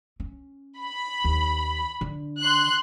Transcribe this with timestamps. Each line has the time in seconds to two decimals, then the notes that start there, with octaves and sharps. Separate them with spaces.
0.20 C#4
0.80 B5
1.24 D#2
2.01 D3
2.40 C6 F#6